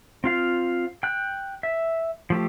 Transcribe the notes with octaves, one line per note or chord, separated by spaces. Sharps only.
C4 F4 F5
G5 F#6
E5
F3 A3 G4